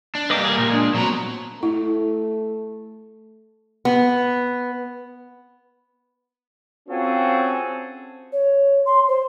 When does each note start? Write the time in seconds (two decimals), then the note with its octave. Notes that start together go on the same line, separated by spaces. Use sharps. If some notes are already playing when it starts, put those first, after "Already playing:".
0.15 D4
0.30 G3 A#3 B4 D#5 D6
0.44 G#4 A#4
0.58 A#2
0.70 G#3 D4
0.95 F#3 B3 C4 F#4 A#5
1.63 A3 E4
3.85 B3
6.89 C4 C#4 F4 F#4 G#4 A4
8.33 C#5
8.86 C6
9.08 C5